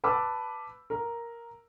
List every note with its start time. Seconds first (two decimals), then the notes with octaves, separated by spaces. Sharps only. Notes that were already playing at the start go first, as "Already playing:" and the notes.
0.04 B4 A5 B5 D6 E6
0.90 A#4